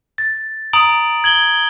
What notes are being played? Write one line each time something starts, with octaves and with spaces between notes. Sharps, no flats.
A6
A#5 D#6 D7 F#7
G#6 F#7 G7